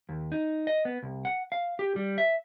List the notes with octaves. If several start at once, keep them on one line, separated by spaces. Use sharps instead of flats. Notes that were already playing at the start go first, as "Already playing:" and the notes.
D#2
D#4
D#5
B3
C2
F#5
F5
G4
G3
E5